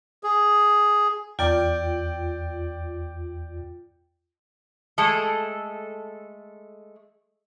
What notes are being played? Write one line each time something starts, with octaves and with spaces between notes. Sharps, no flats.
G#4
E2 F4 D5 G5
G#3 A3 A4